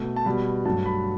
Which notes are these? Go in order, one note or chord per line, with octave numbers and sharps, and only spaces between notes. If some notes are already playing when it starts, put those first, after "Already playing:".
Already playing: B2 A3
A5
B2 G3 B5
G2 F#3 A3 A5
B5